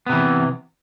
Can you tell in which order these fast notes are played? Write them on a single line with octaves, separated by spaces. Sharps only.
B3 C3 E3